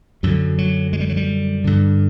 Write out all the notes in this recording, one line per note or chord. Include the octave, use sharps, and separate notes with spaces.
F#2 D3 F#3
F#3
G#3
G3
F#3
G3
G2 D3